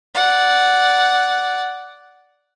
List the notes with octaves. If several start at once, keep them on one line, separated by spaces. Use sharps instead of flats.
D5 F#5